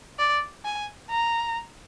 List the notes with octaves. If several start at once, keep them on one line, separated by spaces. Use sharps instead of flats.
D5
G#5
A#5